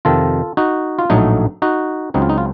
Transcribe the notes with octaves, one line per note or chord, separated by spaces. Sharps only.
F2 C3 D#3 F4 A4
D#4 F#4
F4
A#1 A2 F#3 A3 D#4
D#4 F#4
C#2 C#3 F#3 C4 D#4
F4
D#4
F4